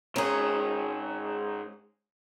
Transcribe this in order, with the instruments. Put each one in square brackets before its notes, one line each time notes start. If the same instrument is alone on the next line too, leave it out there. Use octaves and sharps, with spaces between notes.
[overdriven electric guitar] G#2 A#4 [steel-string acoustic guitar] C#4 G#4